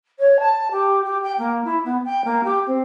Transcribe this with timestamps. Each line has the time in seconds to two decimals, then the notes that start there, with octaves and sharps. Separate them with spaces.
0.19 C#5
0.39 A5
0.71 G4
1.04 G4
1.22 G5
1.38 A#3
1.64 E4
1.84 B3
2.04 G5
2.24 A#3
2.43 G4
2.66 C4